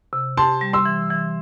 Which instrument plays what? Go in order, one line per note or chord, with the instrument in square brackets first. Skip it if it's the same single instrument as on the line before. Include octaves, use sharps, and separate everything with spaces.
[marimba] C3
[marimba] G4 [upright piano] A5 C6
[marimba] G3
[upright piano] C6 E6
[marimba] E3
E3